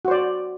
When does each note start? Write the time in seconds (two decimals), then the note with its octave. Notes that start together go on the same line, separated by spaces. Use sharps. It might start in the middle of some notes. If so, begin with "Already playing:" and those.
0.05 F#4
0.08 C5
0.11 D5